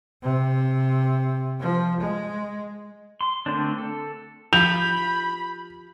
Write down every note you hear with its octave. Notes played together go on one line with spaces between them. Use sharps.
C3
F3
G#3
C6
D3 A3 A#3 C4 D4
A4
F3 G4 B5 G6 F7